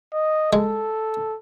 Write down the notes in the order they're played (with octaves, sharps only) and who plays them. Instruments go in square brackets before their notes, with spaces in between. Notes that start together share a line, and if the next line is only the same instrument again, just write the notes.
[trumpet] D#5
[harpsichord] G#3 [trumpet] A4